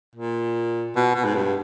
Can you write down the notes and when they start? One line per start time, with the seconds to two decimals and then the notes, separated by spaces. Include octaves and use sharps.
0.15 A#2
0.96 B2
1.15 B2
1.25 G#2
1.35 G2